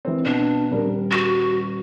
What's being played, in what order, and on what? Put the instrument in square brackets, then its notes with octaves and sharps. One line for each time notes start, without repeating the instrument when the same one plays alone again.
[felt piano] E3 C4
[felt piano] B2 [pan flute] D4
[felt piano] D#1 G3 A#4
[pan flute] F#4